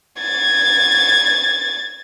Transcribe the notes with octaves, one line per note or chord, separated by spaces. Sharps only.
G#6 A6